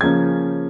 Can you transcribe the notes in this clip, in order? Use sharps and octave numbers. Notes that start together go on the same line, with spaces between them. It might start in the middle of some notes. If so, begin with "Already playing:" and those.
C#3 F3 A#3 C#4 G#6